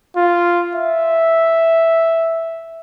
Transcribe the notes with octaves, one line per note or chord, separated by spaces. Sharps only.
F4
E5